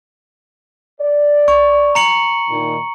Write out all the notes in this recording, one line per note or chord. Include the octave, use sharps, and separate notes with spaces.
D5
C#6
A#5 C#7 F#7
A#2 D#3